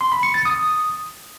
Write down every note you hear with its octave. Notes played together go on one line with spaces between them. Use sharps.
C6
B5
C#7
A6
D#6